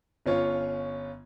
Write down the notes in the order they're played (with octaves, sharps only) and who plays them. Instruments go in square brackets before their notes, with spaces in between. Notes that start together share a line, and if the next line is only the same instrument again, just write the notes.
[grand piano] G1 C#4 F4 C#5